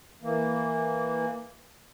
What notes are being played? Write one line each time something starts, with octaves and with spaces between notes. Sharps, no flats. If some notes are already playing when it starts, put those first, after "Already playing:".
E3 A#3